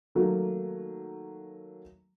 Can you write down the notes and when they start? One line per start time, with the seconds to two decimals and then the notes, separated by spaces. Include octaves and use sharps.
0.15 D#3 F#3 A3 A#3